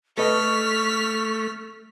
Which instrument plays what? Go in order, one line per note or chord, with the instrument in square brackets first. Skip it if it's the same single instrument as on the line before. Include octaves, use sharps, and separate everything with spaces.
[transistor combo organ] A3 [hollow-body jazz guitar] A4 B4 D#5 [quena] C#6 [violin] F6 B6